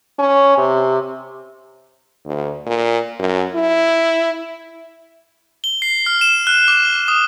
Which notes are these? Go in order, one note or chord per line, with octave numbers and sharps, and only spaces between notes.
C#4
C3
D2
A#2
F#2
E4
G7
C7
F6
E7
F#6
D6
G7
D#6